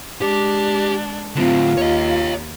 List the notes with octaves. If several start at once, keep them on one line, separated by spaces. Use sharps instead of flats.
G#3 D4 G4
A2 D3 C4 F4
D#2 C#5 D#5